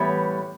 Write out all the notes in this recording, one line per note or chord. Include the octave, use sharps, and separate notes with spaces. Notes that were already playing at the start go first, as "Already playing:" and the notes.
Already playing: A2 E3 G3 B3 C#5